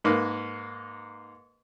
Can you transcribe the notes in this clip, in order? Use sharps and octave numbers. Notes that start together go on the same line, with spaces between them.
G#2 A#3 B4